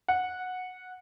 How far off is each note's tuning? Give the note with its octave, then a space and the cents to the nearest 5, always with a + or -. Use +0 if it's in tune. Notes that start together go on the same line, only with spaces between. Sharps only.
F#5 -10